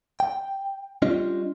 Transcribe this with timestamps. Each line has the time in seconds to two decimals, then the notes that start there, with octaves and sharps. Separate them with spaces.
0.20 G5
1.02 G3 C#4 D4 F4 D#5